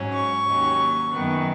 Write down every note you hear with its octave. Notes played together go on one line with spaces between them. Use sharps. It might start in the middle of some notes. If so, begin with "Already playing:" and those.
Already playing: G#2 F#3 C#4
C#6
D#2 D#3 F#3 C#4
F#2 D#3 B3